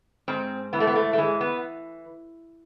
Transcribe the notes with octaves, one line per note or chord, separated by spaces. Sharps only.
G#2 C4
E3 B3
A3
B3
A3
A3
E3 G#3
B3